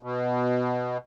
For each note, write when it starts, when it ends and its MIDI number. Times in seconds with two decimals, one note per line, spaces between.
0.03 0.98 47